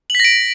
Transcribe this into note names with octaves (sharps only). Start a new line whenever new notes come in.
A#6 B6 D7 F#7